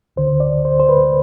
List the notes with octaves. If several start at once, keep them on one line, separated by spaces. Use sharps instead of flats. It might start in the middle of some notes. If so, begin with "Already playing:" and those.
D2 D3 C5
D5
C5
C5
B4